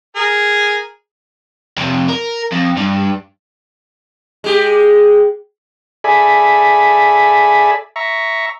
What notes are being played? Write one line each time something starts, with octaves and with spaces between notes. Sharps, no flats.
G#4 A#4
F2 C3
A#4
F2
G2
G#3 G4
G#4 A4 D5 E5 G#5 B5
E5 A#5 C#6